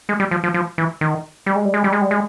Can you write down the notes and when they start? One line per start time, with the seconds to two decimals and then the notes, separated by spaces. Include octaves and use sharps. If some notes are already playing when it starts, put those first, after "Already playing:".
0.09 G#3
0.20 G3
0.31 F3
0.44 F3
0.54 F3
0.78 E3
1.01 D#3
1.46 G3
1.56 G#3
1.65 G3
1.74 G#3
1.84 G3
1.93 G#3
2.02 G3
2.11 G#3